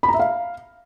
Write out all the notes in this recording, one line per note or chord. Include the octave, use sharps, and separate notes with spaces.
B5
A#5
E5
F5